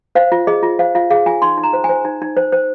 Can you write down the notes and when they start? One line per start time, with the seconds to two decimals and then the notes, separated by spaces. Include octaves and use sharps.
0.15 C5 F5
0.32 F4
0.47 G#4 D#5
0.63 F4
0.79 C5 F5
0.95 F4 F5
1.10 G#4 F5
1.26 F4 G#5
1.42 D#4 C6
1.58 D#4
1.63 A#5
1.73 C5
1.84 G#5
1.89 C5
2.05 D#4
2.22 D#4
2.37 C5
2.52 C5